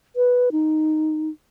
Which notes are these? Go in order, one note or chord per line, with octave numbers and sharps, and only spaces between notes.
B4
D#4